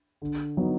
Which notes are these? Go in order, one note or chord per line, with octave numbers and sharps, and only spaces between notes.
D3
F#3 B3 D#4